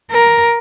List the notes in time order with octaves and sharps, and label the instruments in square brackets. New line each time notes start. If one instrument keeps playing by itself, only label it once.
[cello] A#4